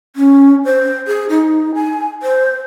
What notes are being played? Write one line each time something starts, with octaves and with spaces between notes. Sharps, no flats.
C#4
C5
G#4
D#4
G#5
C5